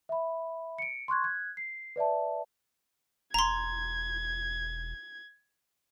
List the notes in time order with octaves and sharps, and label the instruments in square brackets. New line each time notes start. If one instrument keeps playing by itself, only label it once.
[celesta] E5 B5
C#7 D7
C6 C#6 F#6 G#6
F#6 G#6
C7
B4 D5 E5 A5
[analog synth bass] E1 [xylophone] A#5 C6 [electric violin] G#6